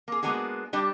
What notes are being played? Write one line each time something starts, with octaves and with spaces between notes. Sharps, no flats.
A#3 G#4
G#3 A#3 B3 D4 F#4 G#4
G3 D4 G4